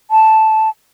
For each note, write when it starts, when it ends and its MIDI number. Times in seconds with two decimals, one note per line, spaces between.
0.11 0.69 81